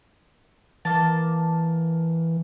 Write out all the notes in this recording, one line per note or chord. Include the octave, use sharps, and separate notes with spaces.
E3 A#3 A5